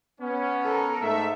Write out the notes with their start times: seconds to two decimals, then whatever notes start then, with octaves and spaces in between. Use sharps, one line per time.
0.19 B3 C#4
0.64 A4 A#4
1.00 G#2 A3 E5